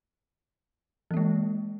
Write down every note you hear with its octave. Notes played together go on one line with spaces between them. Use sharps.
E3 G#3 A#3